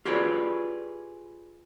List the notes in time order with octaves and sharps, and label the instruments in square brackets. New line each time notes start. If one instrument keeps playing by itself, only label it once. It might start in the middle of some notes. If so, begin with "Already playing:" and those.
[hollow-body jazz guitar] F4 G4 G#4 B4 C#5 D5